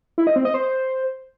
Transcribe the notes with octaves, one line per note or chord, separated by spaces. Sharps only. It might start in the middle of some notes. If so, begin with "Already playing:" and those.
E4
D#5
C4
D#5
C5